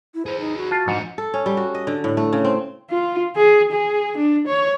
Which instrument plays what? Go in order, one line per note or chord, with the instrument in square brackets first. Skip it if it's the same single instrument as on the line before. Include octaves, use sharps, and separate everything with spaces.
[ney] E4
[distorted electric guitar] G#4 B4 [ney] C5
[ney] D#4
F#4
[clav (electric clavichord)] F4 [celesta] A5 A6
[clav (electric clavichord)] G#2 [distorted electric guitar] F3 D4 [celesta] C#7
[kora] A4
C#4
G3
F#4
D#5
D3
A2
A3
C#3
C4
[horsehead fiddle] F4
G#4
G#4
D4
C#5